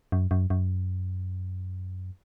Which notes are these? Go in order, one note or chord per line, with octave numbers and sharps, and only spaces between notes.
F#2
F#2
F#2